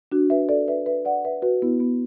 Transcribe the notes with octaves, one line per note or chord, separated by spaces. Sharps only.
D4 F#4
B4 E5
A4 D5
B4 E5
B4 E5
D5 F#5
B4 E5
F#4 B4
B3 E4
B3